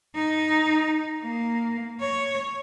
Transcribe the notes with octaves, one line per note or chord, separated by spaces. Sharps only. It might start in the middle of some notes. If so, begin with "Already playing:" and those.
D#4
A#3
C#5